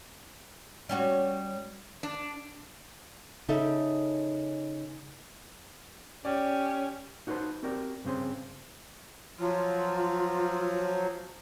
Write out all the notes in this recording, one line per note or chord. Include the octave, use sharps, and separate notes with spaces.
G3 C#4 F#4
D4
C#3 D#4 A4 E5
C#4 G4 D5
D#4 F#4 A4 B4 C5 A5
C4 F#4 G4 A#4 D5
G2 C#3 C4 G#4 C5
F3 F#3 F4